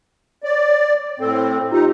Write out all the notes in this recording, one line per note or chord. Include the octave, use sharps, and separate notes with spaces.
C#5 D5
A2 C4 A4
D#4 F4 G4